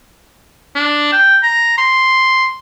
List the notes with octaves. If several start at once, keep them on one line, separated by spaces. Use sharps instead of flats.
D4
G5
A#5
C6